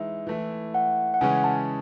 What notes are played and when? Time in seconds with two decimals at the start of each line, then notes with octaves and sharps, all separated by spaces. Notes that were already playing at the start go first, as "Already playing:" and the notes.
Already playing: E3 G#3 D#4 E5
0.27 E3 A3 E4
0.74 F#5
1.14 F#5
1.21 C#3 E3 G#3 C#4 G#5
1.44 A5